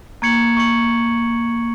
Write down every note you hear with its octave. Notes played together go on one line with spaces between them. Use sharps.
A#3 C#6 G#6 C#7 F#7
C#6 G#6 C#7 F#7